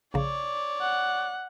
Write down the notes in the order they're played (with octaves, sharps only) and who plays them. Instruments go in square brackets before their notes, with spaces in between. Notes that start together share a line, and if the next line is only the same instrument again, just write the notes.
[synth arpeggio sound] A#1 C#3 [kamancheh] C#5 D5
[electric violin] F#5